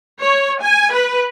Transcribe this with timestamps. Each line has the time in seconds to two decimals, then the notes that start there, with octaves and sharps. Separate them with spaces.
0.23 C#5
0.63 G#5
0.94 B4